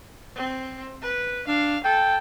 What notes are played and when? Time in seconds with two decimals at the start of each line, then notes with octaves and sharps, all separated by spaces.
0.36 C4
1.02 B4
1.48 D4 F5
1.84 A4 G5